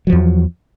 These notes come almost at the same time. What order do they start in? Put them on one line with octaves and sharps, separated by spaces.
F#3 F3 E2